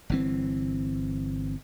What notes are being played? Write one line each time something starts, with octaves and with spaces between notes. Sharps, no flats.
G1 E3 C4